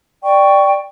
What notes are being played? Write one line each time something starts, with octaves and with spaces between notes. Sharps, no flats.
D5 G5 C#6